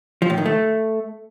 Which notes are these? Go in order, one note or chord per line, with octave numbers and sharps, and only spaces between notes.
F3
A2
D#3
A3